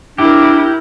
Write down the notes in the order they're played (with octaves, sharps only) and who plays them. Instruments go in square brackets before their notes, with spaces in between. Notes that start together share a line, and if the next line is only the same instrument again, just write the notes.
[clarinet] D4 [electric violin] E4 A#4 [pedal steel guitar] G4